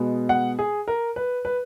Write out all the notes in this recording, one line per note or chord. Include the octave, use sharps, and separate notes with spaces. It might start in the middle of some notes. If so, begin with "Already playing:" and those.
Already playing: B2 G#3 B3
F#5
G#4
A#4
B4
B4